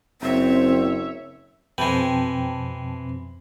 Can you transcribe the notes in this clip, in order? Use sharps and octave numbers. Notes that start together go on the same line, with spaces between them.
F#1 C4 C#5 E5
F2 B2 E3 G#3 C4 G5 A5